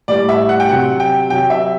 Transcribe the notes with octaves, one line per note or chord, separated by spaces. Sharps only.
A2 G3 D5
E5
F#5
G5
C3 F#3 F#5
G5
C3 F#3 G5
E5